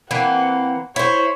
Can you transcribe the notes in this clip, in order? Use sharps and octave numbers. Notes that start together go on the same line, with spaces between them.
E3 A#3 C4 F#5
E4 C5 C#5